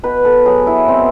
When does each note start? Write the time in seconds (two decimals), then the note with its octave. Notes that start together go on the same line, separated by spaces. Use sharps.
0.03 B2 B4
0.25 A4
0.46 F#3 G#4
0.67 E4
0.88 B2 C4